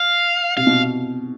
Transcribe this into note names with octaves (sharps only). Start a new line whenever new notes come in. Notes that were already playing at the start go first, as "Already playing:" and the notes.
Already playing: F5
C3 F5
B2